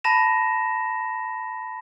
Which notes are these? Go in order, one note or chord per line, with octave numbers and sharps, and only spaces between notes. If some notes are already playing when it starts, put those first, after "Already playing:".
A5 B5 A#6 E7